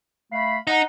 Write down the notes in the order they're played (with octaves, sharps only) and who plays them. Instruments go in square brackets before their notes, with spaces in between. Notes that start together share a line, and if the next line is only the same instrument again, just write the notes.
[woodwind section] A3 F5 B5
[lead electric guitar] D#4 [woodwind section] F#5 A#5